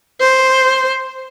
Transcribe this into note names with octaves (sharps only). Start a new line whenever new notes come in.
C5